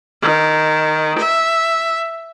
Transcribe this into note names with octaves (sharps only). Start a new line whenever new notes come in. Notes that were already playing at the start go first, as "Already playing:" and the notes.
D#3
E5